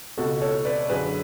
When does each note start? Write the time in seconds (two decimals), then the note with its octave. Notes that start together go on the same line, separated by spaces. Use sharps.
0.18 C#2 B2 F#4 A4
0.41 A4 C#5
0.65 B4 D5
0.89 F#2 D3 G#4 B4